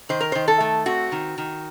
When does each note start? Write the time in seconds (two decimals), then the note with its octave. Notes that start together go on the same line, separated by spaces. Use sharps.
0.09 D#3 C5
0.20 A#4
0.32 D#3 C5
0.48 A4
0.60 A3
0.86 C4 F#4
1.12 D#3
1.38 D#3